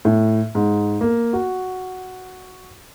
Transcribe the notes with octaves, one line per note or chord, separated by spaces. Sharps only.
A2
G#2
A#3
F#4